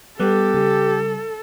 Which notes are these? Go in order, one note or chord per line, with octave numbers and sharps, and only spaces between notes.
G3 B3 G4 A4
C#3 G3